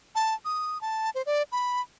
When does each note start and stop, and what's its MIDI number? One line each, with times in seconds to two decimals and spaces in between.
0.15 0.35 81
0.45 0.81 87
0.81 1.10 81
1.15 1.22 72
1.26 1.43 74
1.52 1.81 83